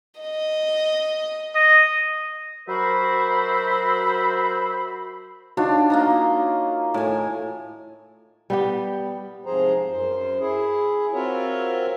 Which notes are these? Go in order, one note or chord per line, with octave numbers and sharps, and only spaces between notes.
D#5
D#5
F#3 F#4 A#4 C5 E5 B5
D4 D#4 F4 F#4 C#5
A#3 D#5 A#5
A2 G#5
G3 B3 G4
G#2 C3 F3 G#4 C5 A#5
F#2 C5
E4 G#4
C4 F4 F#4 A#4 C#5 E5